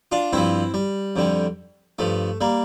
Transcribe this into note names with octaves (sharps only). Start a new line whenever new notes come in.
D4 F4
G2 F3 C4 E4
G3
F2 D3 G3
G2 F3 A3
G3 A#3